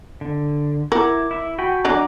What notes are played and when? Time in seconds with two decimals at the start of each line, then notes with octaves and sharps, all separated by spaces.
0.21 D3
0.92 E4 A#4 F#5 D6
1.31 E4 E5
1.58 F#4 G5 G#5 B5
1.85 F#3 D4 D5 A#5 D6 F#6